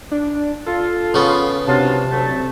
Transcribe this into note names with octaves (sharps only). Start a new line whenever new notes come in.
D4
F4 A4
C#3 B3
C3 F#3 D4 F4 A5
D2 F#3 A3